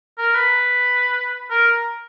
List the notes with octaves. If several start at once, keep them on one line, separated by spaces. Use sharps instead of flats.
A#4
B4
A#4